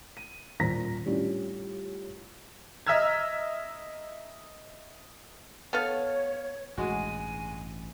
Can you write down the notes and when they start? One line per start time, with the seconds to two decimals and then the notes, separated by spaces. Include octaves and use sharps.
0.17 D#7
0.60 D#1 A#2 C5 A#5 A#6 B6
1.05 A2 G3 C#4 D4 F4 G4
2.87 D#5 E5 A#5 E6 F6 G#6
5.73 B3 A4 C#5 F5
6.78 A1 G2 B2 G#3 F#4 G#5